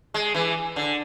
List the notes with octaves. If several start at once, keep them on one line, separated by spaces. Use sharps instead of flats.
G#3
E3
D3